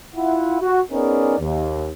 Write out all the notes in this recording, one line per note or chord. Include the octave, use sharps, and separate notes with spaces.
E4 F4 F#5
F#4
B3 C#4 D#4 G#4 A#4 D5
D#2